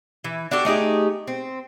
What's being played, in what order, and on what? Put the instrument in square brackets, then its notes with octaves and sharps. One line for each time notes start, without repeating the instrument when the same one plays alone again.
[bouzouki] E3
D4 F#4 G4 A4
A3 D#4 G4 G#4
C4